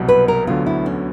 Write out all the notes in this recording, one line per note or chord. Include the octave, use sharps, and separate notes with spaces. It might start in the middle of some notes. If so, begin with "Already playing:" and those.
Already playing: C2 B2 F#3
B4
A#4
D2 D3 F#3 B3 F4
E4
C#4